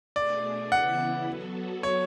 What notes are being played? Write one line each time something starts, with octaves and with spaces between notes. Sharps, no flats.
B2 A3 D4 G#4 D5
C#3 E3 B3 E4 F#5
F#3 B3 F#4 A4
C#5